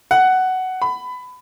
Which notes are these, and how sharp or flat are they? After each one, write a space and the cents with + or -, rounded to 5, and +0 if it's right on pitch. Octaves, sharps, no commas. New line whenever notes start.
F#5 +10
B5 +20